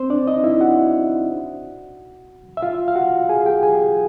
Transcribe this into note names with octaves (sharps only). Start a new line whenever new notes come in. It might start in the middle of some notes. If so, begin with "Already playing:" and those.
Already playing: C4 C5
D4 D5
D#4 D#5
E4 E5
F#4 F#5
E5
F4 F5
F5
F#4 F#5
G#4 G#5
G4 G5
G#4 G#5